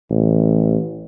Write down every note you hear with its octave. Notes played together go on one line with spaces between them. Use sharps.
A1